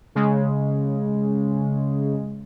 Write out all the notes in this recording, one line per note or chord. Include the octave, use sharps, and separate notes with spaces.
C#3 G#3